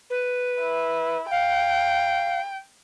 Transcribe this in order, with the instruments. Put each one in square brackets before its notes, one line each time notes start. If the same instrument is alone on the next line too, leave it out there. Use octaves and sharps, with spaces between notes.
[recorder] B4
[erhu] E4
[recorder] F5 [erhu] G5